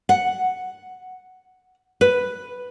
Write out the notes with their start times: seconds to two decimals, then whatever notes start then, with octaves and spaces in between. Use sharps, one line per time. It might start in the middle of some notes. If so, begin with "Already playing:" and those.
0.09 F#5
2.01 B4